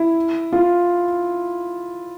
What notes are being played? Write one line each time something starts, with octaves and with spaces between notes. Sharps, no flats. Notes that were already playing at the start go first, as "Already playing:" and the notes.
Already playing: E4
F4